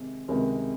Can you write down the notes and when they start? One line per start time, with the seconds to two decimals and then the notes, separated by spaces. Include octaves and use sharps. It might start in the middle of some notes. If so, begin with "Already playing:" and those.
Already playing: C3 D#3 G#3
0.28 C#2 C3 D#3 G#3